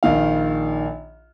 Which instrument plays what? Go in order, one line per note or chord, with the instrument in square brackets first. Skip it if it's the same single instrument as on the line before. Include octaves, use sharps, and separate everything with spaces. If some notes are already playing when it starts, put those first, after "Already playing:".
[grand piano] A#1 D#3 F5